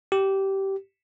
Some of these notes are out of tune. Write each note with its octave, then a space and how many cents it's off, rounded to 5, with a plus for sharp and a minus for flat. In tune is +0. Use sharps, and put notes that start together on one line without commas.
G4 -15